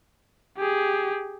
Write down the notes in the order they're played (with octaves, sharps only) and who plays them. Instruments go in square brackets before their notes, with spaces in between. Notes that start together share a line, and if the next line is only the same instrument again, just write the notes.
[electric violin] G4 G#4